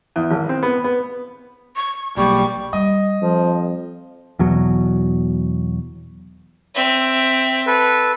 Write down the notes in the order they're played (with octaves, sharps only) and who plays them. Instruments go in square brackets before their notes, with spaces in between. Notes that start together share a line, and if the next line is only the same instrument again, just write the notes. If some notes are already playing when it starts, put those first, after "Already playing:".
[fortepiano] E2
G#1
C4
B3
B3
[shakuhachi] C#6
[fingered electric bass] B1 A#3 [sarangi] G3 [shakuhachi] C#6
[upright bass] G3 [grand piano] D#5
[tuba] F2 [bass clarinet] F3
[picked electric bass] E2 B2 F#3
[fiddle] C4 E5
[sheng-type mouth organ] A4 B4